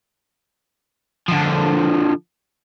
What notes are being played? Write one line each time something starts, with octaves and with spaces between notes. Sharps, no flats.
D3 F3